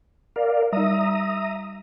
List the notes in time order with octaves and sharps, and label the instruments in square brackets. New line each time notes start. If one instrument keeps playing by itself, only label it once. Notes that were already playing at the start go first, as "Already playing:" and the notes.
[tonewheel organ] A#4 D5 F5
[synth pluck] G3 D#4 [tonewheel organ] E5 A#5 D#6